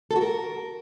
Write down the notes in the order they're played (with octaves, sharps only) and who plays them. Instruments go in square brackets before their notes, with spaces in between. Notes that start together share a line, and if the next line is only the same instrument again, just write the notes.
[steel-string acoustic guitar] A4
F#4
A#4